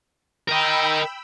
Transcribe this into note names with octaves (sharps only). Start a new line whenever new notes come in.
A#4 D#5 G5 B5 E6